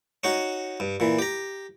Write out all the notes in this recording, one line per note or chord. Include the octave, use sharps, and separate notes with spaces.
C#4 D#4 F#4
G2
A#2 E3
G4 A#5